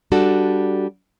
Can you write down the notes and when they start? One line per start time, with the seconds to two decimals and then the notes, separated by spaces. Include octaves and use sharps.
0.12 G3 D4 F#4 A4